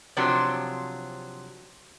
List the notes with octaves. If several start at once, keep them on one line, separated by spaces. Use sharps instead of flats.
C3 F3 F#3 D4